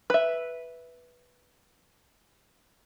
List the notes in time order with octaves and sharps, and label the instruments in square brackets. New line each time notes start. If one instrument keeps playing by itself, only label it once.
[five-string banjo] B4 E5